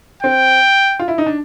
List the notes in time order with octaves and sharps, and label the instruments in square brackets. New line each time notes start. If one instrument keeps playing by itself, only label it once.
[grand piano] C4 [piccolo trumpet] G5
[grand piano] F4
E4
D#4
D4